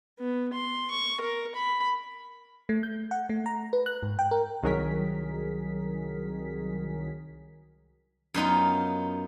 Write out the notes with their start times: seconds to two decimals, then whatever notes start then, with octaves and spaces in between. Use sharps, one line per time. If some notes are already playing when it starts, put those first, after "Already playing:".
0.19 B3
0.53 C6
0.91 C#6
1.21 A#4
1.55 B5
2.69 A3
2.83 G6
3.11 F#5
3.29 A3
3.46 A#5
3.73 B4
3.86 F#6
4.03 G#2
4.19 G5
4.31 A#4
4.63 C2 D#3 F#3 G#4 A#4 B6
8.34 F#2 B3 D#4 F4